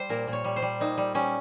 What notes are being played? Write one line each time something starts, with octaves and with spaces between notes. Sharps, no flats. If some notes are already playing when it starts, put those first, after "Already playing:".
Already playing: G3 C5
A#2 A#4
A#2
C#5
G3
C5
G3
A#2 D#4
G3
G3 C#4